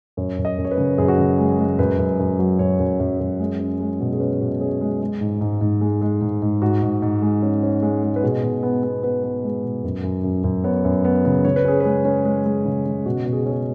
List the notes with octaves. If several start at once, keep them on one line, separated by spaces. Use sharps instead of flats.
F#2 C#5
F#2
D#5
F#2
C#5
B4
C#3
F#2 G#4
F#4
C#3 G#4
G#3
G#3
F#2 B4
F#2
F#2
F#3
F#2 C#5
F#2
F#2
F#2
G#3
C#4
G#3
B2
G#4
C#4 B4
B2
C#4 G#4
G#3
G#3
G#2
G#2
G#2
G#3
G#3
G#2
G#2
G#2 F#4
G#2
G#2
G#3
C#4
C#4
G#3
G#3
B4
B2 G#4
B2
B3
B3
B3 B4
B3
G#3
B2
F#2
F#2
F#2
F#2
B3 C#5
F#2
B3
C#3
C#3 C#5
B4
C#4 G#4
G#3 B4
C#4
G#3
G#3
C#3
C#3
B2 F#4
B2
G#4
F#4
C#4 G#4